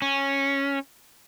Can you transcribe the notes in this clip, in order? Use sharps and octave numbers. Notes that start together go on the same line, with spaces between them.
C#4